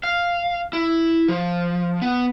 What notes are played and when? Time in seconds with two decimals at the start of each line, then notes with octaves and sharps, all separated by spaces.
0.03 F5
0.73 E4
1.28 F3
2.02 B3